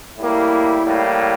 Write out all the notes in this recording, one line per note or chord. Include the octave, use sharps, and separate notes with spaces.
A2 G3 A#3 E4
A2 G3 A#3